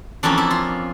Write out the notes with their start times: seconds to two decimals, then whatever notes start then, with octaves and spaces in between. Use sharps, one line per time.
0.23 F2 E3 A#3 C#4 D4
0.38 E4
0.51 F4